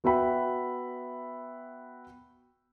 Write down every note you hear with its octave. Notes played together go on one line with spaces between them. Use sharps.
B3 F#4 E5 G5 B5